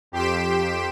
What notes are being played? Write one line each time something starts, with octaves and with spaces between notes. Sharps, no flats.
F2 G4 C6 B6 D7 E7